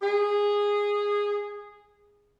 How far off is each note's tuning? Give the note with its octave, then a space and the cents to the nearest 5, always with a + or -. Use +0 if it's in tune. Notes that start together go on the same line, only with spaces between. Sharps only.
G#4 -15